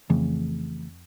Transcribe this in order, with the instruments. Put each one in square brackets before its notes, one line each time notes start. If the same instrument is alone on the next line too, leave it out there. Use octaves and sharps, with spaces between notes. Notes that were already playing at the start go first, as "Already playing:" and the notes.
[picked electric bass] F2 [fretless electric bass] C#3 E3 A3